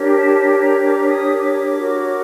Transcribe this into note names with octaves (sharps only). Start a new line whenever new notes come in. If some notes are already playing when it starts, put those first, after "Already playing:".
Already playing: D4 G4 A#4 C#5
A5
A5
A#5
D6
D#6
D6
F#4 A#4 C#5